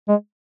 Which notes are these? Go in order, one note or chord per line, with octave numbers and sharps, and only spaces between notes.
G#3